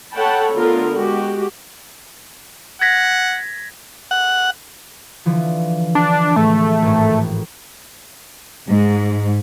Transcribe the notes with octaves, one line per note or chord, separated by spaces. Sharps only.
A4 C#5 F#5 G5 A5 B5
D3 A3 B3 F4 A#4
G#3 F#4 G4
F#5 G#6 A#6 B6
F#5
D3 E3 F3
D4
A2 G#3 A3
G#1 A2
G#2